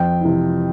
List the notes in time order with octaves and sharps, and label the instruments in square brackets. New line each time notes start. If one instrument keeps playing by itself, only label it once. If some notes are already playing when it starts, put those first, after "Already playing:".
Already playing: [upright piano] F2 G5
C3 E3